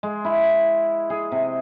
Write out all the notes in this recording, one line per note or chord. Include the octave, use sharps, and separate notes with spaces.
G#3
E4
G#4
C3